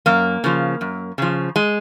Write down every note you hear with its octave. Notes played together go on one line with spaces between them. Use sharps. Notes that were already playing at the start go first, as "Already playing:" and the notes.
F#2 A#3
C#3 F3
F#2
C#3 F3
G#3